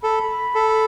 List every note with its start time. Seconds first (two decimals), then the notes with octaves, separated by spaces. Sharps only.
0.02 A4 B5
0.55 A4